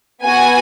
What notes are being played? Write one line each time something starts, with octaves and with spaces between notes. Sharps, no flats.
B3 F#4 G#5